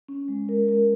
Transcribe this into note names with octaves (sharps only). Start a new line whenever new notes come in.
C#4
G#3
A#4
A#4